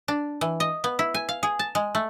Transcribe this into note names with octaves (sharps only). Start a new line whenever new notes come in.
D4
E3
D#5
B3
E4
G#5
F5
G#4
A5
G#3
A3